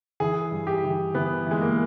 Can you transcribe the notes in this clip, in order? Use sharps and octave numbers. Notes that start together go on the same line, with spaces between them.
E3 G#4
G2
G4
E3
E3 B3
E3 G#3
A#3